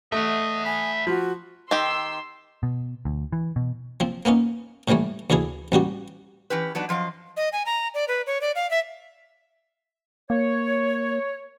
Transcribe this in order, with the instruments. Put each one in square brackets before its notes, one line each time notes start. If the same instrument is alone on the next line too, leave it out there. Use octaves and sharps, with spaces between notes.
[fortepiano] A3 [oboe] D#5 [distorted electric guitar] E5 F#5
[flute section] G#5 D#6 [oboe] B5
[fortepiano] F3 [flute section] F#4
[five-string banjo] D#3 G4 [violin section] C6 E6
[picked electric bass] B2
D2
E3
B2
[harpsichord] F3 C4
A#3 B3 C#4 D#4
A2 D3 E3 G3 A3
D2 D3 E3 E4 G#4
A1 G3 F#4 G4
[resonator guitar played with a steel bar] E3 C#4 G4 B4
F#3 B3 D4 D#4
F#2 F3 D#5 F5
[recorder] D#5
G#5
A#5
D5
B4
C#5
D5
F5
E5
[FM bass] A#3 [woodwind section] C#5